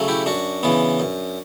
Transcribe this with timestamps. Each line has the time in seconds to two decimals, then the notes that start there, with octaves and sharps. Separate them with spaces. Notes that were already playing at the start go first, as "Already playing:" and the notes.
Already playing: C#3 F#3 A3
0.08 E4 G4
0.26 F#2 D4 F#4
0.63 C#3 E3 B3
1.00 F#2